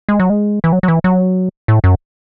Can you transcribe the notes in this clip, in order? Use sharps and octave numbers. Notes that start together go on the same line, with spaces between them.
G#3
F#3
G#3
E3
F#3
F#3
E3
F#3
A2
F#2